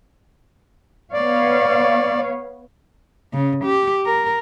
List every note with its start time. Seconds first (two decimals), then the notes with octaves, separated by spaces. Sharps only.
1.13 B3 C#5 D5 F5
3.33 C#3
3.65 G4
4.06 A#4